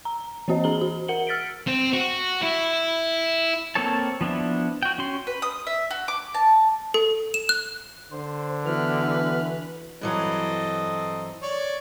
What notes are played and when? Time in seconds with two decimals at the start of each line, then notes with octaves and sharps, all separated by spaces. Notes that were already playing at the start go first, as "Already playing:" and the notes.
0.05 A#5
0.48 E3 A#3 C4 F#4 C5 D#5
0.64 D4 G#4 A#5 F#7 G7
0.81 F#4
1.08 A#4 F#5 C#7 F#7 G7
1.27 E6 F6 A6 B6 C#7 D7
1.67 C4
1.93 F#4
2.43 E4
3.75 A#3 C4 A4 C#5 A5
4.21 F3 B3 D4 E4
4.83 F#4 G5
4.98 C#4 F#4 C6
5.27 B4
5.42 D#6
5.67 E5
5.91 F#4
6.08 D6
6.34 A5
6.94 A4
7.34 E7
7.49 F#6
8.12 D3 C5
8.66 E3 B3 F#4 B4 F6
10.01 G2 E3 F#3 C4 A4 D#5
11.42 C#5 D5